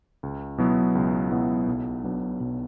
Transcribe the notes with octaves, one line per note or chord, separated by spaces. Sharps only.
C#2
B2 F#3 B3 E4
C#2
B2 F#3 B3 E4
B1
B2 F#3 B3 D4
B1